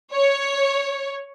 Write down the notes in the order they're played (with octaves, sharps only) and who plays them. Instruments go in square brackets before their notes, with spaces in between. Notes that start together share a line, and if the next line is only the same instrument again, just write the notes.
[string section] C#5